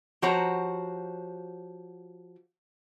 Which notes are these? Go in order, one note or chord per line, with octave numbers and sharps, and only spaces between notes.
F3 F#4 G4 C5 C#5 A#5